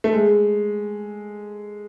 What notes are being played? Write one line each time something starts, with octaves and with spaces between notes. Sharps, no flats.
A3
G#3